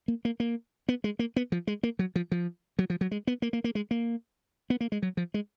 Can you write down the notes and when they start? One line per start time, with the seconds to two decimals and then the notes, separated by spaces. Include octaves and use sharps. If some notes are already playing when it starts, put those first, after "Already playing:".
0.08 A#3
0.25 A#3
0.40 A#3
0.89 B3
1.04 G#3
1.19 A#3
1.36 B3
1.52 F3
1.67 G#3
1.83 A#3
1.99 F#3
2.16 F3
2.32 F3
2.79 F#3
2.90 F3
3.01 F#3
3.11 G#3
3.27 B3
3.42 A#3
3.53 A#3
3.64 A#3
3.75 G#3
3.91 A#3
4.70 B3
4.81 A#3
4.92 G#3
5.02 F#3
5.17 F3
5.34 G#3